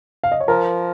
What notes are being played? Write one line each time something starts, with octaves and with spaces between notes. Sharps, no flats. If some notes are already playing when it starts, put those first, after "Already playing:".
F5
D#5
C#5
F3 A#4